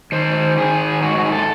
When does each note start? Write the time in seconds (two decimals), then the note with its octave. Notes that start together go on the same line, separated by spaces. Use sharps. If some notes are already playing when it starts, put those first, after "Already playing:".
0.12 D#3 C5
0.57 D#3 G#4
1.02 G#2 F#4
1.16 F#4
1.25 G#4
1.32 A4